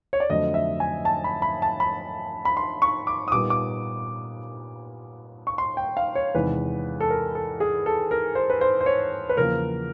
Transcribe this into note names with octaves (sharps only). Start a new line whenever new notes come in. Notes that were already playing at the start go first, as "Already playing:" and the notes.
C#5
D5
F2 D3 F#3 A3 D#5
E5
G#5
A5
B5
B5
A5
B5
B5
C6
C#6
D6
D#6
A#2 G3 B3 D#4 D6
D6
C#6
C6
G5
F5
C#5
E2 C3 D#3 G#3 B4
A4
A#4
A4
G#4
A4
A#4
C5
B4
C5
C5
C#5
B4
E2 C#3 F3 A#3 A#4